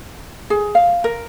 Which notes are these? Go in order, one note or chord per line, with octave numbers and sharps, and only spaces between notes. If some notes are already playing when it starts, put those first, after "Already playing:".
G#4
F5
A#4